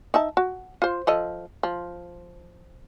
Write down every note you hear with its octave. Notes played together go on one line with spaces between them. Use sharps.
D#4 E5 A5
F#4
F4 C5
F3 A4 D#5
F3